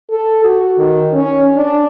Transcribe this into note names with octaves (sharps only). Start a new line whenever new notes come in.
A4
F#4
D#3
C#4
D4